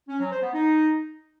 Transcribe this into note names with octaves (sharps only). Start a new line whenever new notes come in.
C#4
F#3
C5
B3
D#4